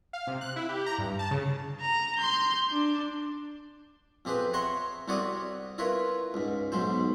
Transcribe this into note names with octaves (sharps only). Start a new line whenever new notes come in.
F5
C3
F#6
E4
G4
A#5
G2
A5
C#3
A#5
C6 G6
D4
F2 C4 G4 G#4 B4
C#5 E5 F#5 A#5 C6 C#6
C2 C4 F#4 C#5 D5 D#6
E4 F4 A#4 B4 C#5
C#2 G#2
B1 G#2 F#3 C5